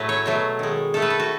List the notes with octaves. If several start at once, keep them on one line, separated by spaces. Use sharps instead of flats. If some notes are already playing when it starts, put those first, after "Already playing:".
Already playing: A2 F#3 A3 B4
C#5
B2 F#3 A3
D#3 G#3
D#3 A3 A4
B4
A4
F#4